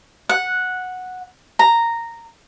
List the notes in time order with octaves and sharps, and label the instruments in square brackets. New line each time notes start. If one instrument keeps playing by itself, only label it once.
[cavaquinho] F#5
A#5